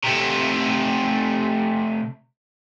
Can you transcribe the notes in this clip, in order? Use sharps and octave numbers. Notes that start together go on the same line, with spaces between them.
C3 A3